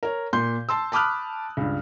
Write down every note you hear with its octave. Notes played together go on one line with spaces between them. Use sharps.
A#4 C#5
A#2 C6 G6
A5 C6 E6
A5 B5 D6 D#6 F6 F#6
C#2 G2